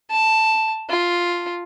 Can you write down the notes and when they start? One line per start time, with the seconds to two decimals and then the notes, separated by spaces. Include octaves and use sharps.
0.11 A5
0.90 F4